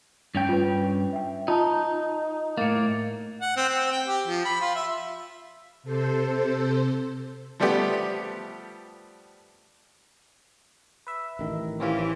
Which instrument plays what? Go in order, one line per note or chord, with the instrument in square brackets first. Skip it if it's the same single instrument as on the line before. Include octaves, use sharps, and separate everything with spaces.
[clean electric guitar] G2 C#4 G5
[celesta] F4 B4
E5 G5
[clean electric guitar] D#4 [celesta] F4 A5 A#5
[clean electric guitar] A2 A#3 [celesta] A6
[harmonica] F#5
C4
C4
G5
G4
F3
B5
F4
E5
[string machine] C3 A4 C5
[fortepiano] F3 G3 A3 B3 G4
[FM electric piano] B4 E5
[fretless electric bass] A1 D#3
[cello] E3 G4 [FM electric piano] C4 C#4 F4